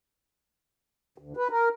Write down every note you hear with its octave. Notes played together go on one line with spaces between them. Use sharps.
D2
B4
A#4